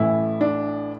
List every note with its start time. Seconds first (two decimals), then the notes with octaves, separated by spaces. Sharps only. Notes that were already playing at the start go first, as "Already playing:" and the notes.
Already playing: A1 A2 E3 E4
0.41 D4